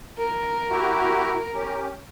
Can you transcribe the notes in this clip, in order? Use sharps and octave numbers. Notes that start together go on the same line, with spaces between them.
A#4
E4 F#4 G4
C#4 G4